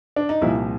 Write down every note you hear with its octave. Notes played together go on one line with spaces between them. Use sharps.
D4
D#4
C2 A#2 F3 E4